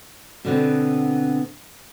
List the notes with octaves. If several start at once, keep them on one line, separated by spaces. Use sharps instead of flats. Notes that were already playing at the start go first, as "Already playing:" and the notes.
B2 D3 B3 C4